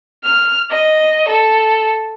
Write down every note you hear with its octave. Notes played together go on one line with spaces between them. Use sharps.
F6
D#5
A4